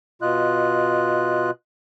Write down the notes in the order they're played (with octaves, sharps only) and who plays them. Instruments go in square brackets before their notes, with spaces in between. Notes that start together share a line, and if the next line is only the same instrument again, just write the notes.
[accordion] B2 F4 D#5 F#6